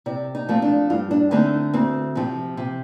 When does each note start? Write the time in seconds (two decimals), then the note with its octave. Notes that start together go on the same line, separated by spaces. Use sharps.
0.06 C3 D5
0.35 D#4
0.49 F3 A3 C4
0.62 D4
0.90 G2 F4
1.11 D4
1.31 D3 A3 C4 D#4
1.74 D2 C4
2.15 C3 F3
2.57 C3